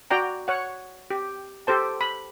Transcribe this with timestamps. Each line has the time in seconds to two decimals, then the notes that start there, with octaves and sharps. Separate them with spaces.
0.11 F#4 D5 G5 A#5
0.48 C#5 F#5
1.10 G4
1.67 G4 A4 C5 A5
2.01 B5